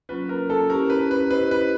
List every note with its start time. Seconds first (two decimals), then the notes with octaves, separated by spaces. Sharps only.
0.09 F#3 A#3 C#4 F4 B4
0.29 A#4
0.50 A4
0.70 C#4 E4 G4 A#4 C5
0.90 B4
1.11 B4
1.31 E4 G4 B4 C5 D#5
1.51 B4